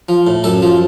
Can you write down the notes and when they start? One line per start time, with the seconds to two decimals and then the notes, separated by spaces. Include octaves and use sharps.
0.09 F3
0.27 A2
0.44 F#2 A4
0.62 F3